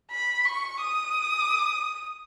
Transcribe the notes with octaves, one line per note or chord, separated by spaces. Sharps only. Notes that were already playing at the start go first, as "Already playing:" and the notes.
B5
C#6
D#6